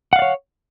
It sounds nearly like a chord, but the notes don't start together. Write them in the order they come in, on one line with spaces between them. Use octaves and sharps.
F#5 F5 D5 C#5